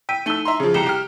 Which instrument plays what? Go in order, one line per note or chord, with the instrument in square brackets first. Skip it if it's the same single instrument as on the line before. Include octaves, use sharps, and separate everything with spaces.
[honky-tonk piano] G5 [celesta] E6 B6 D#7
[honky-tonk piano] A3 E6 [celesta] D#4 D#7 G7
[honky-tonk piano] E5 A#5 C6
[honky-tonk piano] C#3 F3 [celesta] G#4
[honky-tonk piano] C2 G4 A#5 [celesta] C#7 E7 G7
[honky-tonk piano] G4 F6